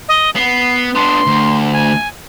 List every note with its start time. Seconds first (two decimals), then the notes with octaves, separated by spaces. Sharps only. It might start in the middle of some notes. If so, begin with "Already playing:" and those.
0.08 D#5
0.36 B3 C7
0.95 B3 D4 C6
1.27 D2
1.73 G#5